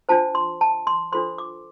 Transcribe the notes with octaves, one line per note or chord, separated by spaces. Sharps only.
D4 F4 C5 A5
C6
A5
C6
D4 F4 A4 C5 C6
D6